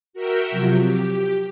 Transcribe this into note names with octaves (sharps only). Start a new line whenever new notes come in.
F#4 A#4 E5 G5
C3 F3 F#3
G4